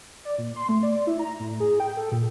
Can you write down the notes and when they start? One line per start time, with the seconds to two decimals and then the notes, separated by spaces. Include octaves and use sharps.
0.25 D5
0.38 A#2
0.56 C6
0.69 A3
0.83 D5
1.07 E4
1.19 A#5
1.40 A2
1.60 G#4
1.80 G5
1.97 A4
2.12 A#2